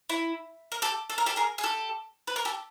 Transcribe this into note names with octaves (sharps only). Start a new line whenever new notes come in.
E4
A#4
G4 A4
A4
A#4
G4 A4
G#4 A#4
G#4
G4 A4
B4
A#4
G4 A4